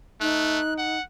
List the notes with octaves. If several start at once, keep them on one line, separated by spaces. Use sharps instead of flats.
A3 D#4 F#6
F#5